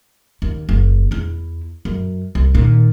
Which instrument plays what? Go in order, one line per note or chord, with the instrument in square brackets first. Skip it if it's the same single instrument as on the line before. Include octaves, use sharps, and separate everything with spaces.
[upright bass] D#2
F#1
E2 E4
F#2
C2
A#2 D#3